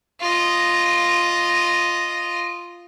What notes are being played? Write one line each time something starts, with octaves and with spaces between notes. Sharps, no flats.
F4 D#5